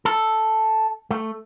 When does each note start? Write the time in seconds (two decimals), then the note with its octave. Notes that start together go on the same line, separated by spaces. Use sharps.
0.05 A4
1.11 A3